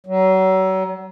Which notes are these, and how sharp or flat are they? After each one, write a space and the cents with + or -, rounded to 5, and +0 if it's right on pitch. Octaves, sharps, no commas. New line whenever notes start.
F#3 +35